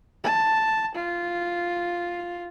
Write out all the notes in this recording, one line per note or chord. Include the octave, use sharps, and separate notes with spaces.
A5
F4